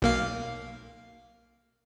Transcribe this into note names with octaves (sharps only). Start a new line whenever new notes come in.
B1 A#3 F5